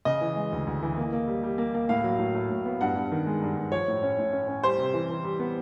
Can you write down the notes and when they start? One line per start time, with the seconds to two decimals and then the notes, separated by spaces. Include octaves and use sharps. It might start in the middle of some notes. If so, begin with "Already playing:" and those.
0.05 C#3 D#5
0.21 E3
0.36 G#3
0.52 D2
0.67 D2
0.82 E3
0.97 A#3
1.13 A#3
1.27 G3
1.43 G3
1.58 A#3
1.74 A#3
1.89 A2 F5
2.04 F#3
2.19 A2
2.35 A2
2.51 A2
2.65 B3
2.81 G2 F#5
2.96 G2
3.11 D#3
3.26 G#3
3.42 G2
3.56 G2
3.72 F3 C#5
3.88 A2
4.03 C#4
4.19 A2
4.33 C#4
4.48 C#4
4.63 G3 C5
4.78 C3
4.94 E3
5.09 E3
5.24 G3
5.39 B3